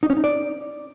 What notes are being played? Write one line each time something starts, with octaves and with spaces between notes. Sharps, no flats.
D#4
C#4
D#4
D5